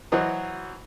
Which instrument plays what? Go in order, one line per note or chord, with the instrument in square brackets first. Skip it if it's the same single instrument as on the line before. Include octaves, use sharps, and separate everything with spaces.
[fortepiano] E3 F#3 F#4 C5 D#5